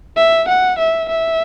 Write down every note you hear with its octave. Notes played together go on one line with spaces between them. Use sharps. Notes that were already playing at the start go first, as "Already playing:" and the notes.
E5
F#5
E5
E5